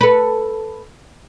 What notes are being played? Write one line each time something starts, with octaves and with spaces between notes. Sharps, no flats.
A4 B4